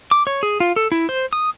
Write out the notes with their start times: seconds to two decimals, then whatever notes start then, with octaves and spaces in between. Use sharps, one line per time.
0.11 D6
0.27 C#5
0.43 G#4
0.60 F4
0.76 A4
0.92 E4
1.09 C5
1.33 D#6